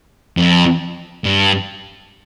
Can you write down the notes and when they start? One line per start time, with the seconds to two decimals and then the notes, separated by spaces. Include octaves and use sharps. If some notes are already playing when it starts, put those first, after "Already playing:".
0.37 F2
1.25 G2